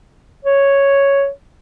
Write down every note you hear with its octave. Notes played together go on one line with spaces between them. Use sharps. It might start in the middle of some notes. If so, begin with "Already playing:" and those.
C#5